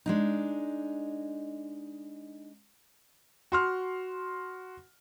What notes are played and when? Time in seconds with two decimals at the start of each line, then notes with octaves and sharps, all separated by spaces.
0.06 G#3 D4 D#4
3.52 F#4 C6 F6